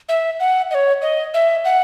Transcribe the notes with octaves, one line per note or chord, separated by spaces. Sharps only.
E5
F#5
D#5
C#5
D#5
E5
F#5